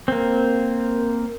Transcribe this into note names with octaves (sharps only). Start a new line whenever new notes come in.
A#3 C4